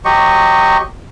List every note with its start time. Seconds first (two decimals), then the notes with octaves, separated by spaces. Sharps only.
0.05 F#3 G4 D#5 C#6